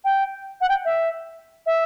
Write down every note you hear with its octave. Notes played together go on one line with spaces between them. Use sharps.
G5
F#5
G5
E5
E5